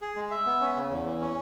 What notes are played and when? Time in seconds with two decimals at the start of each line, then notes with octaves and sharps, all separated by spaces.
0.02 G#4
0.16 G#3
0.31 E5
0.46 B3
0.61 C#4
0.76 C#3
0.90 E2
1.06 E3
1.21 C#4